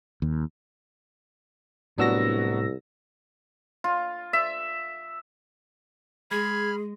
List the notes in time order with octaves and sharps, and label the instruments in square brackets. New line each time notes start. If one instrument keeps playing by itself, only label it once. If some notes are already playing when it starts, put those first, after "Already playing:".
[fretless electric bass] D#2
[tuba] C2 [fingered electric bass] A2 [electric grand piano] F#3 B3 F#4 [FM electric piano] D4 E6 A#6
[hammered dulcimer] F4
E5
[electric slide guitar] G#3 [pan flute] G#4 [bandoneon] B5 F6 [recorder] G#6